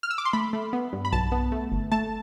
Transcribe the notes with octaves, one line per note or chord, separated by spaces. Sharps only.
F6
E6
D6
C6
A3 B5
A3
B3
G2
B5
B1 A5
B3
A3
G1
A3 A5